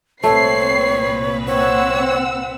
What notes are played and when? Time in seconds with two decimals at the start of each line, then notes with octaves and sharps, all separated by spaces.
0.23 C2 A#2 A3 C4 B4 C#5 C7
1.47 C4 C#5 F#5 E6